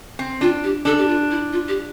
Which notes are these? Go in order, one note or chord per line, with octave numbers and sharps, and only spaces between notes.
C4
D4 F4
G4
D4 A4
G4
F4
E4
F4
G4